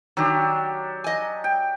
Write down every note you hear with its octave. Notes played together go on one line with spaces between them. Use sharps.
D#3 F#3 D4 G4
D#5 G#5
G5